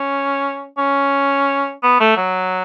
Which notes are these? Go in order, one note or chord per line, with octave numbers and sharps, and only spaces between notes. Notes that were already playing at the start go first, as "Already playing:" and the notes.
Already playing: C#4
C#4
B3
A3
F#3